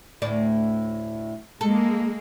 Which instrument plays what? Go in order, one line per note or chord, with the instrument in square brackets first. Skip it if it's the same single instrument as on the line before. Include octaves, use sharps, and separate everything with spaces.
[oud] D2 A2 D5
[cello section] G#3 A#3 [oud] A4